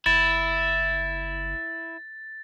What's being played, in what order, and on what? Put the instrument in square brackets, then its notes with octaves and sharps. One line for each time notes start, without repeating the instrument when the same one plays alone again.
[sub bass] F#1 [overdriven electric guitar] E4 [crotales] A6